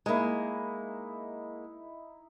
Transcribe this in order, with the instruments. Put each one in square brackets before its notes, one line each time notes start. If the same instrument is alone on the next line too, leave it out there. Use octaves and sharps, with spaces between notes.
[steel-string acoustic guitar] G#3 A#3 [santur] D#4 E4